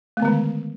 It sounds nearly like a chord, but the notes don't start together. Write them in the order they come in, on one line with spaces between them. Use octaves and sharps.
A3 B3 D3 G#3 D#3